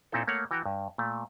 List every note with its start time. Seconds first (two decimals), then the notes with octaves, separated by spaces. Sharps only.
0.12 A#2 C4 D#4 E4 A4
0.27 A3 A#3 C#5 F#5
0.51 E3 F#4 G5 A#5
0.66 G2
0.98 A#2 A3